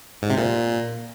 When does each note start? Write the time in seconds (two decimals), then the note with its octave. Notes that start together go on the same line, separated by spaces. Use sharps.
0.22 G#2
0.30 C3
0.38 A#2